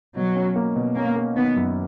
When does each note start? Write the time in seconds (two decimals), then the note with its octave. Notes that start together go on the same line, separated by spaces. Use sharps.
0.16 B2 F#3
0.36 C#4
0.56 A#3
0.76 B2
0.96 A#3 C#4
1.16 A#3
1.36 D#3 B3
1.56 F#2